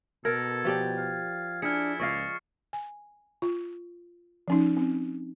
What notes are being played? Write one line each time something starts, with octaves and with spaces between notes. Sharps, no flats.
B2 A4 A#4 G#6 A6
F3 G4 D5
F5
D4 E4 G#4 F6 C#7
C#2 D5 D#5 F5 C#6 A6 C7
G#5
F4
F3 C#4 D#4
C4